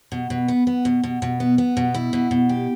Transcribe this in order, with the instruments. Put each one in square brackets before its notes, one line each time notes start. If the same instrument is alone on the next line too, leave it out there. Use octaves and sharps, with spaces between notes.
[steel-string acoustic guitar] B2
B2
B3
B3
B2
B2
B2
B3
B3
B2
E4
B2
B2
G4